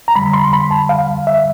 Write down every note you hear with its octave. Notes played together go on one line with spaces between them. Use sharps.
A#5
F2 D3 G3 B5
C6
B5
A5
F5
E5